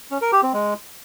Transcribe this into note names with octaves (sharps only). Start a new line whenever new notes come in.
C#4
A#4
G4
C4
G#3